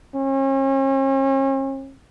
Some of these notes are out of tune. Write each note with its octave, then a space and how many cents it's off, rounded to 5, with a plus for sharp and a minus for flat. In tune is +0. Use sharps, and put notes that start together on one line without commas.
C#4 -40